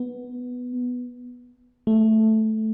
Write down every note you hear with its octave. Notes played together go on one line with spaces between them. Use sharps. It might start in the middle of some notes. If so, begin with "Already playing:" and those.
Already playing: B3
A3